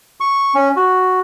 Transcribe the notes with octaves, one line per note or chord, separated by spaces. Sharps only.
C#6
C#4
F#4